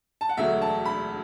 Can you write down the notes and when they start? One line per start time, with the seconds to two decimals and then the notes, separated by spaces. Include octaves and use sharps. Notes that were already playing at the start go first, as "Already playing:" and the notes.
0.21 A5
0.29 F#5
0.37 E1 D2 D3 F#3 E5
0.62 A5
0.85 B5